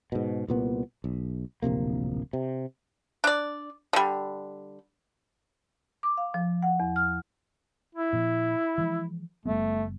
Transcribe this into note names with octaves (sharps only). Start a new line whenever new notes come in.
G#2 B2
C2 A#2 B3
B1
D1 A#1 C3 A#3
C3
D4 D5
D3 G3
D6
F5
F3
F#5
E2
F6
E4
A#2 F3
E3 F3 G#3
F#1 G3 A3 B3